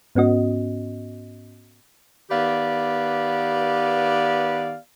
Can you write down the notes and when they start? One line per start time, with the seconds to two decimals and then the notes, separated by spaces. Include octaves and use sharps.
0.15 G#2 B3 C#4 F#4 D#5
2.31 D#3 B3 G4 B4 D5 F5